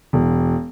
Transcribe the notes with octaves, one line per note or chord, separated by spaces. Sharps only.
E1